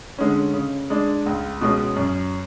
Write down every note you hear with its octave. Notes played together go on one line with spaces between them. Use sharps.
D3 G#3 C#4
C#3
G#3 D4
C#2
B2 G#3 C#4
F#2